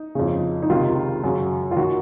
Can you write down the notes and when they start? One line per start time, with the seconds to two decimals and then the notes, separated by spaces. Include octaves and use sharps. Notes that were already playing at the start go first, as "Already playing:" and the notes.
Already playing: D#4
0.15 F2 C#3
0.62 D#4
0.69 C#2 C3 D#3 F4
1.23 F#2 C#3 F#4
1.71 F4
1.77 D#3 F#4